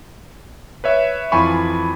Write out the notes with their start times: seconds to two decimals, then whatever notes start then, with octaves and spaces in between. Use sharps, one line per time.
0.84 B4 C#5 E5
1.32 F2 E3 F4 G#5 B5 C#6